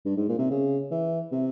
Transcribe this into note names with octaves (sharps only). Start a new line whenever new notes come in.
G2
G#2
A#2
C3
C#3
E3
C3